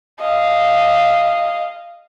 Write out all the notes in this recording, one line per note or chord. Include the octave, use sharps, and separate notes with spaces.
D#5 F5